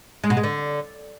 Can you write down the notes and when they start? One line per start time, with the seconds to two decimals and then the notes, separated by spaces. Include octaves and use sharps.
0.24 G#3
0.30 B2
0.37 G#3
0.43 D3